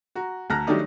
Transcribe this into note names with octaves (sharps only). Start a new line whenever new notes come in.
F#4 A#5
D2 A5 A#5 F6 F#6 A#6
D#3 F#3 G3 A3 D4 D#4